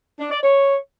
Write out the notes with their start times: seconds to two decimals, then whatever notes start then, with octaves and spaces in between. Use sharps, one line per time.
0.19 D4
0.31 D5
0.42 C#5